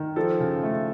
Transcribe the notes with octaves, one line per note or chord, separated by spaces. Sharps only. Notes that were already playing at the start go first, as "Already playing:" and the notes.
Already playing: D#3
F3 A4
C#3
A3